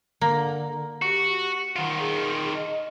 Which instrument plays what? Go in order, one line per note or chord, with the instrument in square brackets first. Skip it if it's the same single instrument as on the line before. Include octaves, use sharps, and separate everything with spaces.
[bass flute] D3 [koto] A#3
[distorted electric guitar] F#4 [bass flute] G4
[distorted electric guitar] D#3 F4 [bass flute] F#5
[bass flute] G#4
D#5